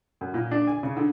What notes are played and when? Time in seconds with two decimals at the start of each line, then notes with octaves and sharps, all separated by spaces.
0.21 F#2
0.34 A#2
0.51 D4
0.67 G#5
0.83 C#3
0.97 D3